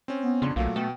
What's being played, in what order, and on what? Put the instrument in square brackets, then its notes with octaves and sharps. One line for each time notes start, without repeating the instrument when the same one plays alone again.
[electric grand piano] C4 C#4
[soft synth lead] B3
[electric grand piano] F2 D4 C6 [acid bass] C#3
[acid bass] B1 [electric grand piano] A#2 F#3 A3 [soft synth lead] F5
[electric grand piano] B2 [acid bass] A3 [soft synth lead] G5